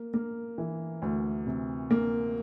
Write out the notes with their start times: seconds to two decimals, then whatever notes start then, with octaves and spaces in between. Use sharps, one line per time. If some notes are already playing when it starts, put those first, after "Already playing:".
Already playing: A#3
0.14 A#3
0.58 E3
1.02 D2
1.47 C3
1.91 A#3